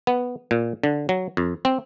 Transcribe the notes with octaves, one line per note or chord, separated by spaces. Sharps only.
B3
A#2
D3
F#3
F2
C4